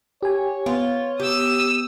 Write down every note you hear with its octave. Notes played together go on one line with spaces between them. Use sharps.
G4 C#5 G#5
B3 F4
G4 D#6 E6